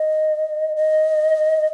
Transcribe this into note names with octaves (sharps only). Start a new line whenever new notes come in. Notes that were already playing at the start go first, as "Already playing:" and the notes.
Already playing: D#5
D#5